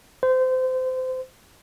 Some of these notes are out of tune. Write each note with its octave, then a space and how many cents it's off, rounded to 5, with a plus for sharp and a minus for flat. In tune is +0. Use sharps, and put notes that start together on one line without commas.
C5 -25